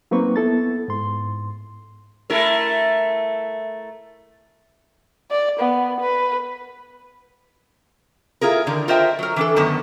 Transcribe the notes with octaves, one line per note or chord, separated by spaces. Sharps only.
F#3 A#3 C4 D#4 B4 C#6
B3 E4 A4 A6
G#2 C6
A3 E4 A#4
D5
B3
B4
E4 F4 G#4 A#4
D3 D#3 D4
F4 A#4 C5 D#5 E5 G5
F#3 A#4
E3 D4 A4
F#2 D3 D#3 B3 A5